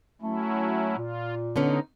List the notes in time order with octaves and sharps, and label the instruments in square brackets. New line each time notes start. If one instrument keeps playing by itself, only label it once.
[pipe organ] F#3 C#4 E4 [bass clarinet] A3
[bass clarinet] A#2 [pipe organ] F4
[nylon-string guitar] D3 B3 C#4 [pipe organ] D#4